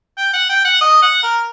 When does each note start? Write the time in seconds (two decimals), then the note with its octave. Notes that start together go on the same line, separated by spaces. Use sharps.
0.18 G5
0.33 F#5
0.49 G5
0.65 F#5
0.81 D#5
1.02 F#5
1.23 A#4